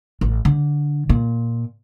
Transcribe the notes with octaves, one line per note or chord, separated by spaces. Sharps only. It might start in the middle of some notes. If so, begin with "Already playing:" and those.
A1
D3
A#2